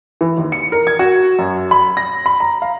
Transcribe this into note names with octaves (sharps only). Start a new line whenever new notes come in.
E3
D#2
C#7
A#4
G#6
F#4
F#2
B5
A#6
B5
A#5
F5